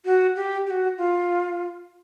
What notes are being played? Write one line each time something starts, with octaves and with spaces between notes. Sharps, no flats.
F#4
G4
G4
F#4
F4